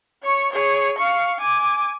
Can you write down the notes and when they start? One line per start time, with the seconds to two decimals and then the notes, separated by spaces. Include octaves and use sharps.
0.23 C#5 C#6
0.52 G#4 C#5
0.98 F5 C#6
1.40 G#5 D6